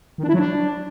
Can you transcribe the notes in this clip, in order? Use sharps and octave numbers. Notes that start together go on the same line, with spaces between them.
D#3
D4
E4
F#3
D4